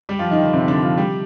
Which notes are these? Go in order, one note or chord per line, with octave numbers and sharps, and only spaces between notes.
G3 G4
F3 F4
D#3 D#4
D3 D4
C3 C4
D3 D4
F3 F4
G3 G4